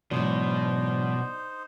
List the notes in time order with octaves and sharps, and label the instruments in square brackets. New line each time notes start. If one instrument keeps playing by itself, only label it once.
[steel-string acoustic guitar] G#2 E3 F#3 [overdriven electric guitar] B2 [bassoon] D4 [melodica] D#4 C5